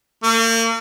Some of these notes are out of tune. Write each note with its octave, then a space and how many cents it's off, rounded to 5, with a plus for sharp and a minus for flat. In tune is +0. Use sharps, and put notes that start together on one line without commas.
A#3 -40